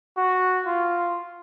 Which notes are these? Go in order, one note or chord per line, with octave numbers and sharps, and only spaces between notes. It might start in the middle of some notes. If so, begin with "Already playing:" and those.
F#4
F4